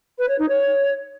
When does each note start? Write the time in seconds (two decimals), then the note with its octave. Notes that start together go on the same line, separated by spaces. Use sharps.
0.18 B4
0.28 C#5
0.39 D#4
0.49 C#5